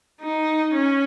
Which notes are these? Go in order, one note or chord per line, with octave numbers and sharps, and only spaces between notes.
D#4
C#4